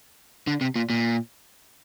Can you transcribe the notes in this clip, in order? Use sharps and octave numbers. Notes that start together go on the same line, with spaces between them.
D3
C3
A#2
A#2